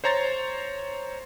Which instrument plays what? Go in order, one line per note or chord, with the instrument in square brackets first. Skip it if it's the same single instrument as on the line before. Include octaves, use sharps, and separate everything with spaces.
[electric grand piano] C5 C#5 A#5 C6 A6